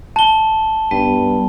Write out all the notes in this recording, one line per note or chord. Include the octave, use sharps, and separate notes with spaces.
A5 G7
G2 G3 B3